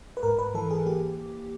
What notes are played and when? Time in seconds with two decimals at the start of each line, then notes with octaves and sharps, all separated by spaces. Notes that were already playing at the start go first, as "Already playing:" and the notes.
0.17 B4
0.23 G#2 A#4
0.39 B4
0.54 E3 A4
0.71 G#4
0.86 A#3 G4